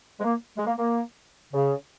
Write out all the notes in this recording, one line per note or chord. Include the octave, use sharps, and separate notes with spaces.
G#3
A#3
G#3
A#3
A#3
C#3